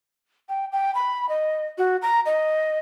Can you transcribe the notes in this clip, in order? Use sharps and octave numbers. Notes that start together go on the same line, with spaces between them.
G5
G5
B5
D#5
F#4
A#5
D#5